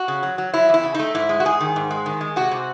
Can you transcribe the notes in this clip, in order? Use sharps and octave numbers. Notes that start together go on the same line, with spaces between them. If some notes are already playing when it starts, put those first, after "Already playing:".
Already playing: F#4
C#3
F#3
F#3
F#3 E4
E2 E4
C#3
A3 D#4
G#2 E4
G#3
F#4
G#2 G#4
D#3
G#2
G#3
D#3
G#3
C3 F#4
C3